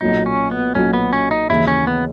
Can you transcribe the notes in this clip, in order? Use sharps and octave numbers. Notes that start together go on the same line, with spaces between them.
B1 A#2 F#3 D#4
C#4
B3
B1 A#2 F#3 C#4
B3
C#4
D#4
D#2 C#3 E3 E4
C#4
B3